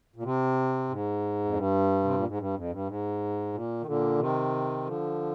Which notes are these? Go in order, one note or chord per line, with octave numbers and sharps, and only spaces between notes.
A#2
C3
G#2
F2
G2
C3
A#2
G#2
G2
F2
G2
G#2
A#2
D#3
A#2 D3
C3 D#3
D3 F3